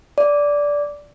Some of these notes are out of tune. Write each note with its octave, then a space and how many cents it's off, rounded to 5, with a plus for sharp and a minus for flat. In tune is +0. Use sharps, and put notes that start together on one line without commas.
D5 -10